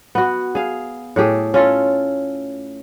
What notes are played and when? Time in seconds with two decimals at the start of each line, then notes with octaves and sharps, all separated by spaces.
0.15 B3 F#4
0.55 G#4 F5
1.16 A2 A3 G4 G#4
1.54 C#4 F4 A4